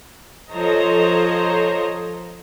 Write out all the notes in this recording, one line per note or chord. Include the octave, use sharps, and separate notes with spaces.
F3 A4 C5 C#5 D#5 A#5